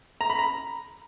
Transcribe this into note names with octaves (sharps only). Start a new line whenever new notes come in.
A#5
B5
A#5